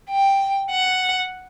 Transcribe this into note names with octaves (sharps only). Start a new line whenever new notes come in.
G5
F#5